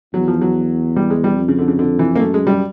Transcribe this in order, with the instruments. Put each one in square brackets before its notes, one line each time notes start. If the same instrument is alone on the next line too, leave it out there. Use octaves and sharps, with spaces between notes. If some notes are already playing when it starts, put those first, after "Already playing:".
[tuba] E2 [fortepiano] F#3
[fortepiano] F3
F#3
G3
G#3
G3
[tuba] F2
[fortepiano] C#3
D3
C#3
D3
E3
A#3
[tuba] F#2 [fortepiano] A3
[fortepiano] G#3
G3